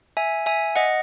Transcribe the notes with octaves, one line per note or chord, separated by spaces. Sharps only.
E5 G#5
E5 G#5
D#5 F#5